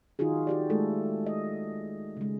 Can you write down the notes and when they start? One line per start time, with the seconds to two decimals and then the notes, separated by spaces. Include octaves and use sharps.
0.19 D#3 D#4 F4 F#4 G#4
0.47 F#4 G4 D5
0.70 G#3 A3 A4
1.26 D#5
2.17 C#3 G#3